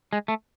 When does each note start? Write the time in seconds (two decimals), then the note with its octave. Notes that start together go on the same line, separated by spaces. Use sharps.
0.13 G#3
0.28 A3